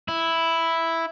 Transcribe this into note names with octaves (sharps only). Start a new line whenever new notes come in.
E4